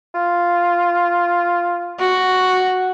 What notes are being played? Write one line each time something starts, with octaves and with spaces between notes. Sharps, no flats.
F4
F#4